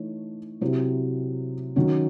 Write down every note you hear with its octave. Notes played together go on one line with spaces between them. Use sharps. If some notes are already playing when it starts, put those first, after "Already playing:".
Already playing: E3 A3 D#4 C#5
C3 F#3 C4 E4
D#3 F#3 C#4